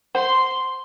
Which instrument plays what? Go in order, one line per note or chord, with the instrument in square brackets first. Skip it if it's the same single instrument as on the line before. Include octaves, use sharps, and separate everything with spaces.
[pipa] C5 [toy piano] F#5 [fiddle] C6